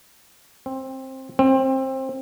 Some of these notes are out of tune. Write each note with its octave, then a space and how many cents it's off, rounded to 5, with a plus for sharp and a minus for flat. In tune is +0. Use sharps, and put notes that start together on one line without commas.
C4 +15
C4 +20